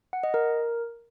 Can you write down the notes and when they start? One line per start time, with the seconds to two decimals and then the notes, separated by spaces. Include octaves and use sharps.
0.13 F#5
0.23 D#5
0.34 A#4